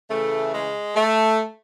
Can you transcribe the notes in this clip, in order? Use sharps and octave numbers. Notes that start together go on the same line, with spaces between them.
C#3 E3 A3
G#3
A3